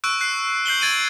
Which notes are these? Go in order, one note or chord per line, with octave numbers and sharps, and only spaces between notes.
C#6 E6 F#6 D7
F#6 C7
G6 C7 F#7 G7
G#6 A6 D7 D#7 F#7
D7